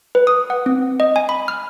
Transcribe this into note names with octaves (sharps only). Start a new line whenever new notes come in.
B4
D#6
F#5
C4
D#5
G#5
B5
F6